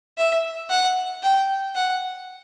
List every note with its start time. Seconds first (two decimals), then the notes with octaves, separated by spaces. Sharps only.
0.18 E5
0.70 F#5
1.23 G5
1.75 F#5